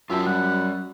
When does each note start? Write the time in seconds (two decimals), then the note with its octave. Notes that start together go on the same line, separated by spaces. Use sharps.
0.10 F#2 F4 E5 G5 A5
0.26 G3 F#5